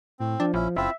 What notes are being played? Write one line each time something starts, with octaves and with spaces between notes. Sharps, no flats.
A2 C4
F3 D4
A#1 C#4 E4
F#1 C4 E4 F4 E5